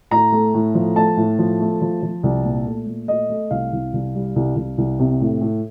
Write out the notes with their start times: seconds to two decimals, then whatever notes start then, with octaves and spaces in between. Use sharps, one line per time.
0.11 A2 A#5
0.32 A3
0.54 A2
0.75 F3
0.96 A3 A5
1.17 A2
1.39 F3
1.60 A3
1.82 F3
2.03 F3
2.23 C2
2.45 A#2
2.66 A3
2.87 A#2
3.08 A3 D#5
3.30 A3
3.51 C2 F5
3.73 C2
3.94 C2
4.15 G3
4.36 C2
4.56 C2
4.78 C2
5.00 C3
5.21 A2
5.41 A2